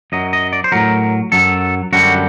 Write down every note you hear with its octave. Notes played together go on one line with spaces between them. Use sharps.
F#2 F#3 D#5
D#5
D5
C5
A2 F#3 A#4
F#2 F#3 A4
F#2 D3 G3 F#4